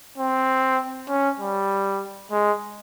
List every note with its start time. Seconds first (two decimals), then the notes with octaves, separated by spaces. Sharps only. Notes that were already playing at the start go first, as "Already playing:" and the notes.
0.18 C4
1.09 C#4
1.40 G3
2.31 G#3